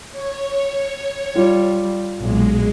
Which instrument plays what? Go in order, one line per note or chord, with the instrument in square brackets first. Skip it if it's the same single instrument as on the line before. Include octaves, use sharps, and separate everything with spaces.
[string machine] C#5
[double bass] G3 [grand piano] F4
[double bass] B1 A#2 [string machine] G#3